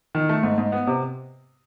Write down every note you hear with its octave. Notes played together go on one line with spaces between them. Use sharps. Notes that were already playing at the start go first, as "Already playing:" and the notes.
D#3
A3
G#2
G#2
B3
C3